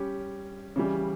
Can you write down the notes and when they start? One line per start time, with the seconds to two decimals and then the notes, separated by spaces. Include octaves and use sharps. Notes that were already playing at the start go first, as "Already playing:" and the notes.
Already playing: G3 C#4 G4
0.76 C#3 E3 G3